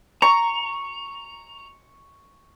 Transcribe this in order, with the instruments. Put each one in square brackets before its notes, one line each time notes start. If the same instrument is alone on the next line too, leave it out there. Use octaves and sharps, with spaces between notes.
[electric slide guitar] A#5 [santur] C#6